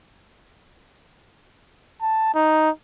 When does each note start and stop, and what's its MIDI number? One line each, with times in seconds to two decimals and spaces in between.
2.01 2.33 81
2.34 2.70 63